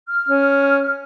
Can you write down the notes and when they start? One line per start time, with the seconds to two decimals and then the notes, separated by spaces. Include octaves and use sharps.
0.09 F6
0.29 C#4